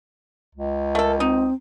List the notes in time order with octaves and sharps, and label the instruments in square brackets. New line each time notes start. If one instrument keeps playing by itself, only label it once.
[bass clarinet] C#2
[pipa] A3 A4 [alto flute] A#4
[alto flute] C4 [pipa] D#4